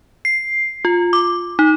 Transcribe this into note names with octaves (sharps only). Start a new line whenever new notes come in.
C7
F4
D6
D#4